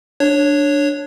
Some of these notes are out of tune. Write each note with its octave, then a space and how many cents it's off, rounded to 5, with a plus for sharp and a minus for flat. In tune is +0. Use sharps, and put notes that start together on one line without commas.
D4 +0 C#5 +0